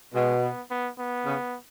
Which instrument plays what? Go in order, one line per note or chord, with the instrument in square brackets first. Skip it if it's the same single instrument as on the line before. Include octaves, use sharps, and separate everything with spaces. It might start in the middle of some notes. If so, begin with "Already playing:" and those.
[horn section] B2 [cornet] G#3
[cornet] B3
B3
B3
[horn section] C#3